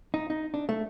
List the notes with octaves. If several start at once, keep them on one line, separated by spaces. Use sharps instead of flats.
D#4
D#4
D4
A3